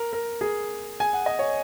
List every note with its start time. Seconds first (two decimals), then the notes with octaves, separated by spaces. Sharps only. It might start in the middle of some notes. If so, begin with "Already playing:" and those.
Already playing: A#4
0.13 A#4
0.41 G#4
1.00 G#5
1.13 F#5
1.26 D#5
1.39 C#5